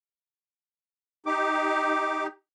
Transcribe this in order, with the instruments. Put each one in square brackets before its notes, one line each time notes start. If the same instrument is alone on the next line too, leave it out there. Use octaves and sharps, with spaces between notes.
[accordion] D#4 G4 [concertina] D6